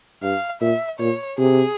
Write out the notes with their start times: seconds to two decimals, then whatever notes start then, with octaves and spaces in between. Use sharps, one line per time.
0.23 G2 F5
0.61 A#2 E5
0.99 A#2 C#5
1.38 C3 G#4